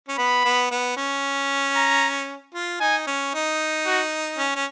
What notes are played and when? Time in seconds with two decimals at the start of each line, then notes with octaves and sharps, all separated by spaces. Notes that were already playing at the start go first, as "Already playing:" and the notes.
0.08 C#4
0.18 B3 B5
0.45 B3
0.71 B3
0.97 C#4
1.76 A#5
2.54 F4
2.80 D#4 G#5
3.07 C#4
3.34 D#4
3.86 F#4
4.38 C#4
4.55 C#4